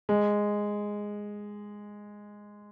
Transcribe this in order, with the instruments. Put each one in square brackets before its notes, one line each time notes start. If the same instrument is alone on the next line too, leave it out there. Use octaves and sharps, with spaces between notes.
[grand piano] G#3